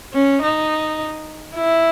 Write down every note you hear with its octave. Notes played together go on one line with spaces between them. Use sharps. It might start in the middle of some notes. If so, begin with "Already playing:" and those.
C#4
D#4
E4